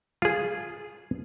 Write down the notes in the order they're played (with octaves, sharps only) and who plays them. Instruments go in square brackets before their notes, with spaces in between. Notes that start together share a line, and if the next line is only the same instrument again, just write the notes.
[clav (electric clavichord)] F4 G#4